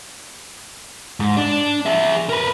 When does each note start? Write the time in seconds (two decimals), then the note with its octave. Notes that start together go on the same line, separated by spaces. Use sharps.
1.20 G#2
1.37 D4
1.86 G#4 E5
2.29 A#4 B4